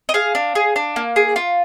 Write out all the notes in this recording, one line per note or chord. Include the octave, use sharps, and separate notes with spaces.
D#5
G#4 F5
D4
G#4
D4
A#3
G#4
F4